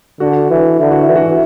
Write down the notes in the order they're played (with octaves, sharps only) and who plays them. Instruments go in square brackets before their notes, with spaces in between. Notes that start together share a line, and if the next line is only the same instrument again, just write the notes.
[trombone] D3 [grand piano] F#4
[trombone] E3
[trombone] D3 [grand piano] E4
[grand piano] F#4
E4
[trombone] E3
[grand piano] F#4
E4